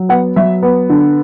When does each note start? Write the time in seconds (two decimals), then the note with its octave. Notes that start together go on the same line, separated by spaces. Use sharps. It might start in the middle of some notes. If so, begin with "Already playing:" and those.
Already playing: F#3
0.09 B3 F#5
0.36 F#3 E5
0.63 B3
0.90 D3